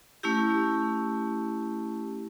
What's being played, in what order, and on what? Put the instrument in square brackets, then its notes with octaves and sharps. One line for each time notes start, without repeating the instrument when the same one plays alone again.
[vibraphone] A3 C#4 E4 G4